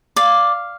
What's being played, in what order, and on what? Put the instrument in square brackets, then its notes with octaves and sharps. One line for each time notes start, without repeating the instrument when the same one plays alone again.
[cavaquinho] D5 F5